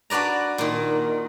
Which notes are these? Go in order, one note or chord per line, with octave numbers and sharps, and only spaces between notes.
D4 F#4 B4 D5 A#5
A#2 D#3